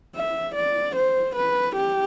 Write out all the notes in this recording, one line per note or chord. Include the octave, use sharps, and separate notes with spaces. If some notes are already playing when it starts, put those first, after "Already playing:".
E5
D5
C5
B4
G4